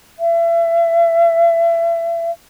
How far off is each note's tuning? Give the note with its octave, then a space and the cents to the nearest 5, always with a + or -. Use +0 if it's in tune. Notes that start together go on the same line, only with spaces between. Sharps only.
E5 +35